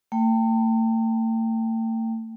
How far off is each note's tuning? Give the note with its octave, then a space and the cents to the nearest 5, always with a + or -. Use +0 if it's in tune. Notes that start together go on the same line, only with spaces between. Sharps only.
A3 +40 G5 +0